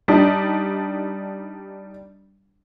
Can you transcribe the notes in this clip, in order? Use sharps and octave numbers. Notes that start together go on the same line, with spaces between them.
G3 D4 D#4